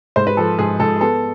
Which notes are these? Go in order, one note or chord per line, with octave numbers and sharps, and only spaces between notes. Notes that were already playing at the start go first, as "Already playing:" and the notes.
G#2 C5
B4
F3 A4
G#2 G#4
G#2 A4
B3 A4